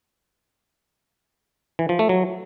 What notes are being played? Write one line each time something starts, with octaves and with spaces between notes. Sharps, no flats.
E3
F3
A3
F#3